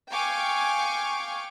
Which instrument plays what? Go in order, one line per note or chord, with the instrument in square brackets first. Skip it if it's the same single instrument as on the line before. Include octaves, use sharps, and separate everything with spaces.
[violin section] F5 G5 G#5 C#6 D6